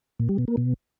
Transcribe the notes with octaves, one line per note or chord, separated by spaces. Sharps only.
A#2
G3
B2
A#3
B2